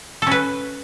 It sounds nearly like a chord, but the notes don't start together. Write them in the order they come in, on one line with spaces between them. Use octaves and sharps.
A4 C#4 B4